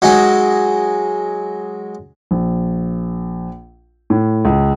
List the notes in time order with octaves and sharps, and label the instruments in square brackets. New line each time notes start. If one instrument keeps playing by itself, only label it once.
[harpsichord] F#3 G#3 D#4
[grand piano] A#1
A2
C#2